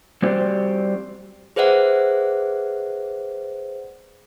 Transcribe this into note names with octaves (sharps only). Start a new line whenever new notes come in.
G3 C4 F#4 G4 C5 D5
G#4 B4 C5 D5 E5 F#5